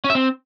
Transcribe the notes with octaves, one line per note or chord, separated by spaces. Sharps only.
C#4
E5
C4